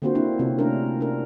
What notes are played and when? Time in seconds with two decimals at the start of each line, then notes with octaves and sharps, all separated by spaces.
0.02 D3 A#3 C4 F4 F#4 C5
0.15 A#3 C4 D4 E4
0.39 C3 C4 C#4 F4
0.59 A3 C#4 D4 A#4
1.01 D4 A#4